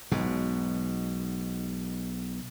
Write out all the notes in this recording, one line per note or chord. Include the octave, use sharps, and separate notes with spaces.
B1 G#2 B2